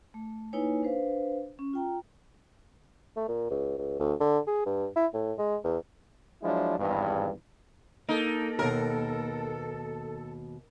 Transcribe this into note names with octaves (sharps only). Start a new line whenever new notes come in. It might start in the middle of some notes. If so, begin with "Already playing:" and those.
A3
A#3 D#4 E4 B4 C#5 G#5
D4 B4 C5 F5
C#4
F4 G5 A#5
A3
A#2
C#2
C#2
D2
D3
G#4
G2
E4
A2
G#3
E2
F3 F#3 G#3 D4 E4
G#1 E2 G2
A#3 D#4 A4
D#2 B2 A#4